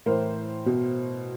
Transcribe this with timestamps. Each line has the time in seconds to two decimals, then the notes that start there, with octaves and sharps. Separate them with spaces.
0.06 A2 E3 A#4 C5
0.66 B2